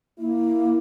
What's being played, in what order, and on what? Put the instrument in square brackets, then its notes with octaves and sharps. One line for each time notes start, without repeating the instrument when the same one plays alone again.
[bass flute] A#3 [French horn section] E4